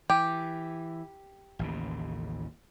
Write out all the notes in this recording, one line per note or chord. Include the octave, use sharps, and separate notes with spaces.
E3 G4
A1 D#2 C#3